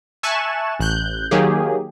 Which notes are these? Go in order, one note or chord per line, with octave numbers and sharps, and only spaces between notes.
E5 G#5 A5 C#6 F#6 E7
A1 F#6 G6
D#3 F#3 A#3 G4 G#4